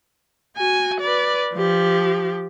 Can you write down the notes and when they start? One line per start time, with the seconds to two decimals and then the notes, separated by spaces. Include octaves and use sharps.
0.57 F#4 G#5
1.01 B4 D5
1.54 F3 G4